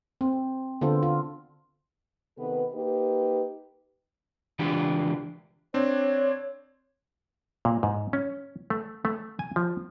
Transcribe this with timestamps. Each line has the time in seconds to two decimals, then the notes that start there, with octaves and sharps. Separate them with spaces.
0.21 C4
0.81 D3 B3 F4 A4 C5
1.03 F4
2.37 C3 D#3 B3 A4 B4
2.73 A#3 D#4 G4 B4
4.59 C#2 E3 D4 F4 G4
5.74 C4 D4 C#5
7.65 A#2
7.83 G#2
8.13 C#4
8.70 A3
9.05 A3
9.39 G#5
9.56 F3